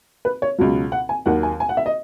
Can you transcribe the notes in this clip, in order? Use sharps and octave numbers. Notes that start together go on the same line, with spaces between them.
B4
C#5
C#2 B2 F#3
F#5
G#5
D#2 D#3 F#3 F#5
G#5
G#5
F#5
E5
D#5